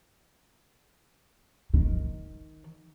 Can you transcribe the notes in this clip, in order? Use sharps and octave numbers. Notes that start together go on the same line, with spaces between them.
D#3